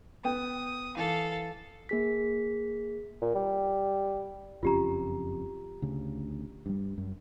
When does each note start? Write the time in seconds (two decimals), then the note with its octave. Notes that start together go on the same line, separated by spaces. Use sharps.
0.25 B3 G5 D#6
0.97 E3 A4 F5
1.89 A#3 G#4 B6
3.22 A#2
3.35 G3
4.63 F#1 F2 C#4 F4 G4 A#5
5.82 D2 C#3
6.66 G2 G3
6.98 F#2